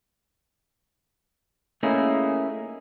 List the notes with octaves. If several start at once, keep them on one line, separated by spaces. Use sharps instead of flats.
A3 A#3 C#4 D#4 E4 G#4